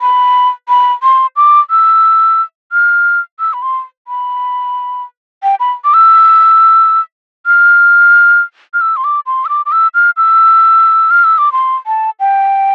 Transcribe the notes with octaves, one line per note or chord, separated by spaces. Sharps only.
B5
B5
C6
D6
E6
F6
E6
B5
C6
B5
G5
B5
D6
E6
F6
F6
E6
C6
D6
C6
E6
D6
D6
E6
F6
E6
F6
E6
D6
C6
A5
G5